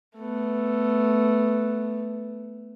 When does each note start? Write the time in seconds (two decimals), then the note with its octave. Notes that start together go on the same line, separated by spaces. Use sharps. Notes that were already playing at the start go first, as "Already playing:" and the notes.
0.16 A3 B3